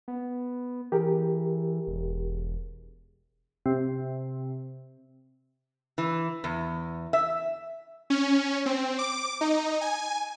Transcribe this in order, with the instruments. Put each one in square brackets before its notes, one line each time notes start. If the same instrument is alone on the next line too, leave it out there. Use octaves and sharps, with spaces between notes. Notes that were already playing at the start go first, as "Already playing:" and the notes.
[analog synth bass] B3
[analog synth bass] E3 [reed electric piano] G4 G#4 A#4
[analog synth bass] E1
[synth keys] C3
[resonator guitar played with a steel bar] E3
E2
E5
[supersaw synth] C#4
C4
D6
D#4
G#5